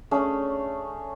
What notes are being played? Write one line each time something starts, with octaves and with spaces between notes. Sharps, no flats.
A3 C#4 D4 G#4